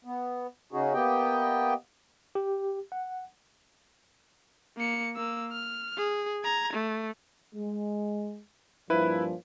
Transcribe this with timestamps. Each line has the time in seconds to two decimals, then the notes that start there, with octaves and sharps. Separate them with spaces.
0.05 B3
0.73 C#3 C#4 D#4 F#4 G#4
0.93 A#3 B3 G4 D#5 G5
2.35 G4
2.92 F#5
4.77 A#3 C#7
5.16 A#3 E6
5.52 F6
5.98 G#4
6.44 A#5 G#6
6.73 A3
7.55 G#3
8.90 G2 A#2 F3 E4 B4